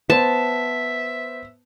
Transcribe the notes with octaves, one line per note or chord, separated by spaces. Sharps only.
B3 C5 E5 A5